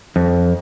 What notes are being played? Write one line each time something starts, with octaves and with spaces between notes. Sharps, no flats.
F2